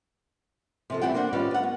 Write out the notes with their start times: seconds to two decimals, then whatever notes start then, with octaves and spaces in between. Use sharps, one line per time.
0.90 C3 F3 A4
1.01 E3 G3 C4 E4 F#5 G5
1.14 A#3 D4 C5 F#5
1.33 D#3 G3 C#4 F4 B4 D5
1.51 F4 F#5
1.63 B3